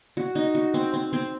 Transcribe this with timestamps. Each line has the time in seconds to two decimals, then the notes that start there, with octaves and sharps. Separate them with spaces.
0.17 F#4
0.35 D#4
0.55 F#4
0.74 C4
0.94 C4
1.13 C4